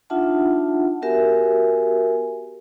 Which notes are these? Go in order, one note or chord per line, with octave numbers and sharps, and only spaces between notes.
D4 D#4 F4 E5 F#5 A5
B3 F#4 G4 A#4 E5 G#5